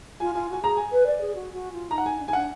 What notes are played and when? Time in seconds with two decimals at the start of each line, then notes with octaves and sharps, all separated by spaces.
0.20 F4 G#5
0.35 F4 G#5
0.49 F#4 G#5
0.63 G#4 A#5
0.77 G#5
0.91 B4
1.06 D5
1.20 G#4
1.35 F#4
1.53 F#4
1.72 F4
1.91 D#4 A#5
1.98 F#5
2.06 G#5
2.19 D4
2.27 D#4 G#5
2.33 D4 F#5